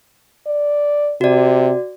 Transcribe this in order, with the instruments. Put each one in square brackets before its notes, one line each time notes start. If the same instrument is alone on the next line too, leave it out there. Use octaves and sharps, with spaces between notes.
[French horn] D5
[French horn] C3 [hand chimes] F#4 D5